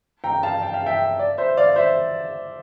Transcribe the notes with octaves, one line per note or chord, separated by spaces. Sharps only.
G5 A#5
F5 A5
G5
F5
E5 G5
D5
C5 E5
D5 F5
C5 E5